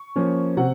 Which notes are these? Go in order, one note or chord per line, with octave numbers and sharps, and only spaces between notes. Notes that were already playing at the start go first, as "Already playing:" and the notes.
Already playing: C#6
F3 A#3 C#4
C3 F#5